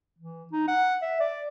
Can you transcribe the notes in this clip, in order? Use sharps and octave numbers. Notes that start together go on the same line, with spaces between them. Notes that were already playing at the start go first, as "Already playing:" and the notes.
E3
D#4
F#5
E5
D5